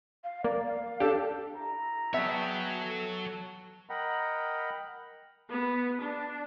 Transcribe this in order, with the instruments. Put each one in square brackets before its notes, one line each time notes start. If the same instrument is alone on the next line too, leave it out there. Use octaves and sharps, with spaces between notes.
[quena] F5
[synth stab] A#3 [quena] D5
[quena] F5
[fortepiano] D4 A4 [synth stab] G4
[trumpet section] E4 A#5
[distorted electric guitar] F#3 C#5 [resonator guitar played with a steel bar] B3 E5 [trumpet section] G#4 G5 A5
[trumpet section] A4
[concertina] A#4 D#5 F#5 G5 A#5 B5
[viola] B3
D4